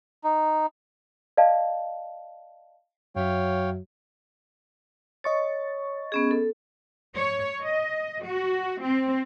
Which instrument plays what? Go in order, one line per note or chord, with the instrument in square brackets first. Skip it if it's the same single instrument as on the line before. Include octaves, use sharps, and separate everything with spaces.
[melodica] D#4
[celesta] D5 D#5 F5 A5
[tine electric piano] F#2 E5 [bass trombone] F#3 [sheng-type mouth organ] C#5 F5 G5
[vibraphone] C#5 [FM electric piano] D#5 C#6 A6
[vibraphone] B3 C#4 G#4
A4
[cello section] C#5
D#5
F#4
C4